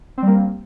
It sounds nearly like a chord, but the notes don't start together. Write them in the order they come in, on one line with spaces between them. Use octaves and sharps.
C4 G3 A#3